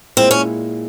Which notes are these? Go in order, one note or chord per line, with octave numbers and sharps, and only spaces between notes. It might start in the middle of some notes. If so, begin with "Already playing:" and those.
A#2 G#3 C4 E4
C#4